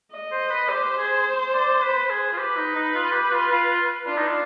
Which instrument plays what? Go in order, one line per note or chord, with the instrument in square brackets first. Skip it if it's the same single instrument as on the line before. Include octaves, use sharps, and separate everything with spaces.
[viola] D#5
[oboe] C5
B4
[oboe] G4 [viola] C5
[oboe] G#4
D5
B4
G#4
F4
[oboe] G4 [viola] B4
[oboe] D#4
D#4
F4
G4
F4
F4
[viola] D4 [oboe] F4
[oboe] D#4
F4